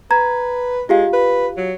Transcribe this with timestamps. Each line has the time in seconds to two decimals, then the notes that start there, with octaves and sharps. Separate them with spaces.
0.11 B4 A#5 G#6
0.89 G#3 F4 G4 F5
1.13 B4
1.57 F#3